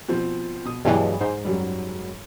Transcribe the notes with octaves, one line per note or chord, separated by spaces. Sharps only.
B2 F3 C4
B2 D#6
G2 B2 E3 F#3 G#3
G#2 C5
F#2 F#3 G3